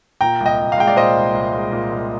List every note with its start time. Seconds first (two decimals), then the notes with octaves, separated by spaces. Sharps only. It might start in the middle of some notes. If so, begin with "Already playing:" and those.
0.21 A#2 G5 A#5
0.40 C2
0.46 D#5 G5
0.59 C2
0.72 F5
0.78 G#3 G5
0.87 D5 F5
0.96 A#2 C5 D#5
1.16 C2
1.34 C2
1.53 G#3
1.72 A#2
1.91 C2